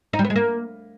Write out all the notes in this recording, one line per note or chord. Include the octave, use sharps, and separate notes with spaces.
D#4
G3
B3
G#3
A#3